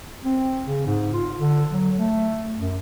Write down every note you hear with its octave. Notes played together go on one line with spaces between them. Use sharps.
C4
C#3
G#2
F4
D3
F#3
A3
F#2